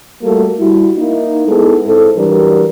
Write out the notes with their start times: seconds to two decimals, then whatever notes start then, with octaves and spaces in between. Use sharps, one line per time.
0.23 G3 A3 A#3 F4 F#4 A4
0.59 G3 E4 F#4
0.97 A#3 D#4 E4
1.46 G#3 B3 D#4 E4 G#4 A4
1.85 G#2 C4 E4 A4
2.16 E3 F#3 G3 D4 G4 A#4